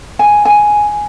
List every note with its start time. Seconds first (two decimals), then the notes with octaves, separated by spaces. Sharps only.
0.19 G#5
0.45 G#5